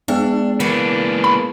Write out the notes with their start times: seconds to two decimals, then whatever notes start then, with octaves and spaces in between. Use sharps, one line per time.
0.08 G#3 B3 D4 G#4
0.60 C#3 E3 A#3 D4
1.24 B5